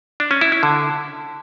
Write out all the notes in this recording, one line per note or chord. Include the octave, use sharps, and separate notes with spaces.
D4
C#4
E4
E4
D3